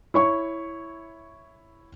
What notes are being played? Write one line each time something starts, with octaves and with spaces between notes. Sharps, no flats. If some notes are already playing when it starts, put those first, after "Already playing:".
E4 C#5 C#6